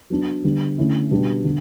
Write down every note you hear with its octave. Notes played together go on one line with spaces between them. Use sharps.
F#3 B3 D4
D3 G3 B3
D3 A3 C#4 E4
B2 G3 D4 G4
D3